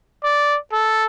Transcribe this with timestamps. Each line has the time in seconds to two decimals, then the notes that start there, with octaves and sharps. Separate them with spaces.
0.24 D5
0.72 A4